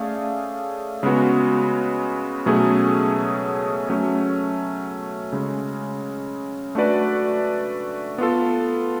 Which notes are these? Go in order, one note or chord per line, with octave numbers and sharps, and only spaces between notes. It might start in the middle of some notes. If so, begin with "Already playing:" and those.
Already playing: A3 C#4 G#4 D5 F5
C#3 G#3 B3 F#4
B2 F#3 A3 C#4 G#4
F#3 A3 C#4
C#3 G#3 C#4
A3 D4 F#4 B4 D5
B3 F4 A4